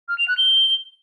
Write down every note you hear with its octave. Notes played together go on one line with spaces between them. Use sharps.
F6
F7
F#6
G7